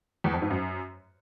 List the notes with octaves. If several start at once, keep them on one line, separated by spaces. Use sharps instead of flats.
E2
F2
G#2
F#2